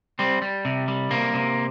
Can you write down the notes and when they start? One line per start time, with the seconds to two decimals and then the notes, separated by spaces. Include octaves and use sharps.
0.19 G3 C4
0.42 G3
0.65 C3
0.88 G3
1.11 C3 A#3
1.34 C3